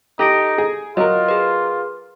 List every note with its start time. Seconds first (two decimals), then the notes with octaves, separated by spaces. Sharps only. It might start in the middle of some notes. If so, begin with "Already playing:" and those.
0.19 D#4 G4 A4 A#6 D7
0.58 G#4
0.97 F#3 F4 A#4 D#5
1.28 G#4 B4